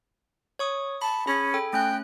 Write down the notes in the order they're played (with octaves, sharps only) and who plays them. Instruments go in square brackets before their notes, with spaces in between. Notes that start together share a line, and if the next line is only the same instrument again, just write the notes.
[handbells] C#5 C#6 D#6
[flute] A5 [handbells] B5
[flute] C#4 [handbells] G#4 B5
[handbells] A4 G5
[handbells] A3 C#4 F#6 [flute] G5